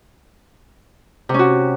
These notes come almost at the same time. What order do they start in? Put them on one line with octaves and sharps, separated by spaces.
C3 C#4 F#4